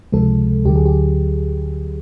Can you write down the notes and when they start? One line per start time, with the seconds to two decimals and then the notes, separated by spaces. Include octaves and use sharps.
0.12 C#2 C3 F3 G#3 A4
0.65 D2 D3 F#3 G4
0.76 G#4
0.86 G4